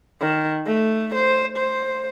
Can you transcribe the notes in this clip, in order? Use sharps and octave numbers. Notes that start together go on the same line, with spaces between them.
D#3
A3
C5
C5